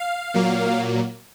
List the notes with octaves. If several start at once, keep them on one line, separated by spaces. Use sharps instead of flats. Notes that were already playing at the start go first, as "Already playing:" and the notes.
Already playing: F5
A#2 F#3 A#3